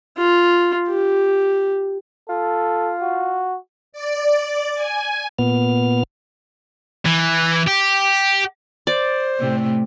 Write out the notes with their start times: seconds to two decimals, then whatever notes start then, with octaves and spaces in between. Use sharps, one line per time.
0.18 F4
0.88 G4
2.29 F4 A4
3.02 F#4
3.93 D5
4.75 G#5
5.39 A#2 B3 F6
7.06 E3
7.67 G4
8.87 C5 D5
9.38 A2 C3 A3